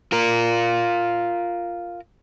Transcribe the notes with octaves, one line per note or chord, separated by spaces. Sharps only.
F4 A#4